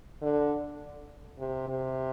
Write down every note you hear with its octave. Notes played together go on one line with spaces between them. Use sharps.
D3
C3
C3